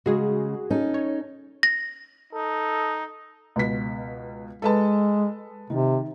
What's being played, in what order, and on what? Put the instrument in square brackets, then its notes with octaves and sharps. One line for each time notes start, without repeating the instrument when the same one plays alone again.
[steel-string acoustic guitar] C#3 G#3 [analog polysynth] F#4 G#4
[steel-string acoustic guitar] C#4 D#4 A4
[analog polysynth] C#5
[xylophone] A#6
[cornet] D#4 [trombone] A4
[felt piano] C#2 B2 B6
[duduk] G#3 [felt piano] A4 B4 A5
[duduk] C3 [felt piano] D#3